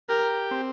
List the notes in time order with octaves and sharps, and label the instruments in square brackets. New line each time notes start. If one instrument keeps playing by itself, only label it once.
[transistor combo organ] G4 [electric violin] A#4
[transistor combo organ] C4